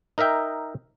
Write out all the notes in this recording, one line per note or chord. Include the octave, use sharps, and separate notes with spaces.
D#4 A#4 D#5 E5 G5